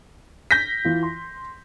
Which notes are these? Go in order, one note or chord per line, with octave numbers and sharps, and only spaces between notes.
G6 A#6 B6
E3 F4
C6